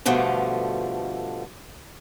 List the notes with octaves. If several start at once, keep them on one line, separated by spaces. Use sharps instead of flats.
G2 B2 D3 F3 A3